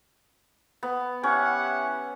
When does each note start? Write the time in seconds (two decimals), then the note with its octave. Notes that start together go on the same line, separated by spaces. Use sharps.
0.83 B3
1.23 C#4 E4 G4 F#5